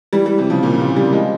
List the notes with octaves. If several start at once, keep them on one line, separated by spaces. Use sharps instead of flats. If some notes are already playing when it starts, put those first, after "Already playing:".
E3 G3
E3 G3
C3 E3
C#3 F3
A#2 C#3
C3 E3
E3 G3
F3 G#3